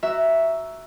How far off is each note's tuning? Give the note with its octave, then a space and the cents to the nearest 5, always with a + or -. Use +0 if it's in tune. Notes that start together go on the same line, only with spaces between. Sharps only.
F#4 +10 E5 +0 A#5 +0